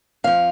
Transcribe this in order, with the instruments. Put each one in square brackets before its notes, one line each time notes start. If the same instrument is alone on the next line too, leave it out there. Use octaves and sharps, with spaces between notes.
[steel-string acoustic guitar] F2 F3 F5